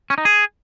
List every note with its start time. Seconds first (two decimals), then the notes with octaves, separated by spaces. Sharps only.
0.10 C#4
0.18 D#4
0.25 G#4